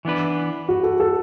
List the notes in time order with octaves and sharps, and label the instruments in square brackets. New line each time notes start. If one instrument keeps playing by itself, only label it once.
[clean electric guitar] E3 B3 D4 B4
[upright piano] F#4
A4
A4